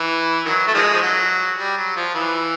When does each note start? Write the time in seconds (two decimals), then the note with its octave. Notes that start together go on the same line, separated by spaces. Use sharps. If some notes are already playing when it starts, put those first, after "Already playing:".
Already playing: E3
0.46 D#3 F#3
0.67 A3
0.74 D#3 F3 G#3
0.93 F3
1.02 F#3
1.58 G3
1.78 F#3
1.96 F3
2.14 E3